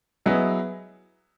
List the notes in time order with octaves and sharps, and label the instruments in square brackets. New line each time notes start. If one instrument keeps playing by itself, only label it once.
[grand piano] F#3 B3 E4 G#4 D#5